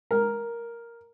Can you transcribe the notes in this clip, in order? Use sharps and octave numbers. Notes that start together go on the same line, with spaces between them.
A#4